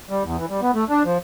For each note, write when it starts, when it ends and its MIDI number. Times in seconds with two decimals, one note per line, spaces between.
0.10 0.23 55
0.24 0.37 40
0.38 0.46 52
0.49 0.61 55
0.62 0.71 59
0.74 0.84 57
0.89 1.03 62
1.05 1.18 53